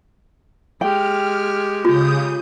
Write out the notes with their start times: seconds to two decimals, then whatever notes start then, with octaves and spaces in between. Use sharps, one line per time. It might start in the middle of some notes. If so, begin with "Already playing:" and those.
0.81 G#3 G4 G5 F6
1.85 C#3 F4 D#6 G6